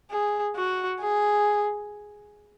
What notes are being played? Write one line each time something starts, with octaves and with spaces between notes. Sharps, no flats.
G#4
F#4
G#4